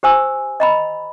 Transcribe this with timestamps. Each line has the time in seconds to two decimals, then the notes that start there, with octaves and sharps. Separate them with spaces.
0.03 G4 C5 G#5 E6
0.60 D#5 A#5 B5